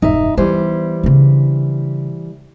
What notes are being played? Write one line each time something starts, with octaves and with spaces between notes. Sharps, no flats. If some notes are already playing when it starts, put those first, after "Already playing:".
E1 G2 D#4 E5
E3 G3 B3 C5
C#3 D4